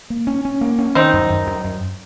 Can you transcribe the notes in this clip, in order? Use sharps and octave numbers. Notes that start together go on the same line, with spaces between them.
A#3
C#4
C#4
A#3
C#4
D#3 C4 D#4
F#2
F#2
F#2
F#2